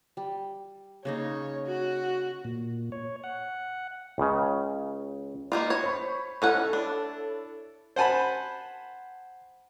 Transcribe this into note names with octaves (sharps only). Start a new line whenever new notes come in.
G3
C#3 A#3 D#4 C#5
F#4
A#2
C#5
F#5
C#2 C#3
A#3 D#4 F4
C#5
C5 B5 C#6
C#4 D#4 E4 A4 C#5 F#5
D4
C5 F#5 G#5 A5 B5